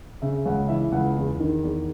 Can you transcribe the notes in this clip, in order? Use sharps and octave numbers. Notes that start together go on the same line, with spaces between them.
C#3 E5
C#2 F#5
E3 E5
C#2 F#5
E2
D#3
E2